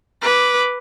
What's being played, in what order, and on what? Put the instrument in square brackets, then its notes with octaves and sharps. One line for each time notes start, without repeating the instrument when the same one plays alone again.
[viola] B4 D6